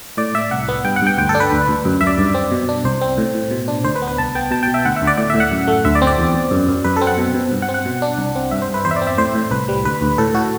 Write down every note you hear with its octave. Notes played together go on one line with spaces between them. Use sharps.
A2 D5
A2 E5
C2 F#5
B3
G2 G5
F#5
G2 G5
D2 G5
A4
D4
B4
D2
D2
F#2
F#2 E5
D5
G2
C4
B2
D4
C2 C5
C4
A2
A2
B2
D4
D2 C5
B4
B3
B4
C2 A5
B3 G5
B2 A5
B2 G5
E5
D2 F#5
E5
D2
D5
A2 D5
A2 E5
F#5
F#2
A3
D2 E5
D5
C4
D5
E2
E2
F#2
F#2
F#2 B4
C4 A4
F#5
B2
B2
G2
F#5
C4
F#5
B2
D4
C2
C4
G2 E5
C5
G2
B4
E2 C5
E5
D5
C4
E5
A2 C5
A2
C2 B4
G3
D2 B4
D2
A2 A4
A2 F#4